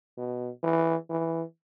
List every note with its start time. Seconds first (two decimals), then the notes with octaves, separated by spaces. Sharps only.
0.17 B2
0.63 E3
1.10 E3